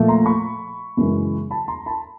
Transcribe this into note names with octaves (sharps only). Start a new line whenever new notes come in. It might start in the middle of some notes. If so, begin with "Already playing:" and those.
Already playing: A#2 F3 A3
A#5 C6
B5 C#6
F#2 C#3 E3 G#3
A5 B5
A#5 C6
A5 B5